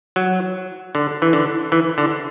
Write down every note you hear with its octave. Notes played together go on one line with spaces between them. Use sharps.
F#3
D3
E3
D3
E3
D3